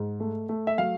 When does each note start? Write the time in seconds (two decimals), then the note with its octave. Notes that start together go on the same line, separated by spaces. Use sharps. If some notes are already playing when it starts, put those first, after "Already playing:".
Already playing: G#2
0.20 A3
0.49 A3
0.67 E5
0.78 F#3 F5